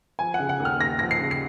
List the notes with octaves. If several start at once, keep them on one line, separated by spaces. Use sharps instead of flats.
F3 G#5
F#5
C#3
F#5
D#2
F6
D#2 A#6
F3 A#6
C7
C#3
C7